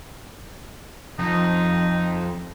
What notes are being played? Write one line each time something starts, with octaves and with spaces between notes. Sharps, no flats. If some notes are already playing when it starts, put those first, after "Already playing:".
F2 D#4